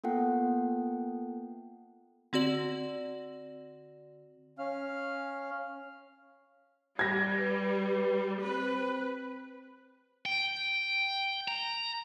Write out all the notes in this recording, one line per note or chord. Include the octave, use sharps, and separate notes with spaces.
A#3 B3 F4 A4 F#5 G5
D3 C4 F#4 D5 F#7
C#4 F5 F6
G3 G#6 A#6
B4
C4 B4
G5
A#5